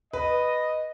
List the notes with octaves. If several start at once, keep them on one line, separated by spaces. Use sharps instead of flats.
B4 D#5